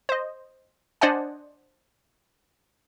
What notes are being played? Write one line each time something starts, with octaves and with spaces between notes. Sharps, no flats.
C5 D#5
D4 C5 D5 D#5 F#5 G#5